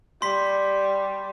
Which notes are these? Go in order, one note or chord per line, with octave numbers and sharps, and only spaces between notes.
G3 C6 B6